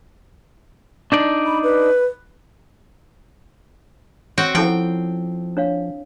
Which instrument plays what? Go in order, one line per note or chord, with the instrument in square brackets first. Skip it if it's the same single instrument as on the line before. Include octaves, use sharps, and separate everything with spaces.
[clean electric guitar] D4 D#4 D5
[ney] B5
B4
[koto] C4 F#4 G5 [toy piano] C#5
[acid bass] F3 [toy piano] C#4 E4 A4 [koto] G5
[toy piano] D4 C#5 F5